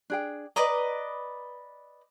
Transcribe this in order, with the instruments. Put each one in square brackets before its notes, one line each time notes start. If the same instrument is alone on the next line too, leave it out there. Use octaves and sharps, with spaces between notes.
[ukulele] D4 G#4 G5
[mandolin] B4 D5 D#5 [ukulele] A#5